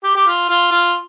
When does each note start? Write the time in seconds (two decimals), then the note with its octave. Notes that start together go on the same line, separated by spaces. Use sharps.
0.04 G4
0.15 G4
0.27 F4
0.50 F4
0.72 F4